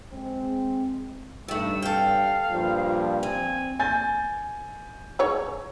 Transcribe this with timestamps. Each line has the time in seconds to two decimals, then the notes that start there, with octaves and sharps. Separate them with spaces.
0.13 G#3 C4
1.48 G2 D#3 A3 E6
1.82 A4 F5 G5
2.50 G2 A#2 F3
3.23 C4 G#5
3.79 G#5 G6 A6
5.19 G#4 C#5